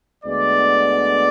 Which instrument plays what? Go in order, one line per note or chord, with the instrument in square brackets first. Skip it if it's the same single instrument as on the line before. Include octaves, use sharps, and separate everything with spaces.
[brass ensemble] D2 D3 G#3 B3 D5